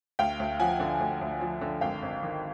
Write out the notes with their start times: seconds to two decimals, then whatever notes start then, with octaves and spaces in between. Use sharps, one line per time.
0.19 D2 F5 G5
0.40 D2
0.59 F3 F#5 G#5
0.80 D3
1.00 D2
1.21 D2
1.41 F3
1.61 D3
1.81 G#1 F5 G5
2.02 G#1
2.23 D#3